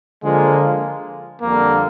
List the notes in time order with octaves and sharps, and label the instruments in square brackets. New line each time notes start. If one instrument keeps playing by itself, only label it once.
[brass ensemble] D3 F3 A#3 F4 [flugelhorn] G#3
[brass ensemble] F2 D3 G3 [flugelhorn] A#3